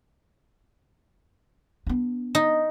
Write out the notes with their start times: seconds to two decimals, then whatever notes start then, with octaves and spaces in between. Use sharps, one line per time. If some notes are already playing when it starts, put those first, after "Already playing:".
1.87 B3 D4
2.35 D#4